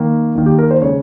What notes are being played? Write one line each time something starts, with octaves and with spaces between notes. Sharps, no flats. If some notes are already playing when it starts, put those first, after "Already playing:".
Already playing: D#3 A#3
D#3 A#3
G4
A#4
C5
C#3 G#3 C#5